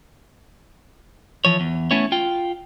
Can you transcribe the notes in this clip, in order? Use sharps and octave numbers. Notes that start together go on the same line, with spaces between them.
E3 F3 C#5
E2
A3 B3 C#4 E4 C#5
F4 G5